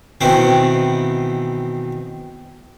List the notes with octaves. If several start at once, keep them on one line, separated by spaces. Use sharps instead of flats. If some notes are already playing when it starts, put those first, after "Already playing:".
B2 D#3 E3 B3 C4